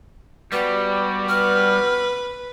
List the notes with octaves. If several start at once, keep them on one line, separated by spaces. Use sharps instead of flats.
G3 B3 F#4 G4 B4
B4 F6